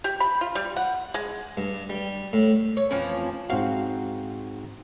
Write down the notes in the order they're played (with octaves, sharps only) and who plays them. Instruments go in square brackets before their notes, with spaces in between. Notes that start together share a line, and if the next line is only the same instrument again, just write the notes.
[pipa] G4
B5
F4
G3
F#5
G#3
[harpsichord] G2
G3
A2
[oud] C#5
[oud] F2 E3 F3 [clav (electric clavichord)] C#4
[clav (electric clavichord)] G#2 C4 F#4 [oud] F5